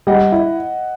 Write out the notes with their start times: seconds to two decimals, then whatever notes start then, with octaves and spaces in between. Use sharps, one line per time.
0.07 G3 D#5 F#5
0.32 E4